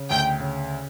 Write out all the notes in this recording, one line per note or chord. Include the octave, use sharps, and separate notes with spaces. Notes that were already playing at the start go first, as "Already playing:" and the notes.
Already playing: C#3
D2 G5
C#3